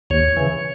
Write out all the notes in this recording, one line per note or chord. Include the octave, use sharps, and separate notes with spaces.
D#2 C#5
C#3 E3